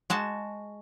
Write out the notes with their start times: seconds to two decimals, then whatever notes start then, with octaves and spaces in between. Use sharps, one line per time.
0.10 G#3 F#4 A5